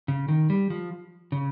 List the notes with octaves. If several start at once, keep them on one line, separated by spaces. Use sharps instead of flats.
C#3
D#3
G3
F3
C#3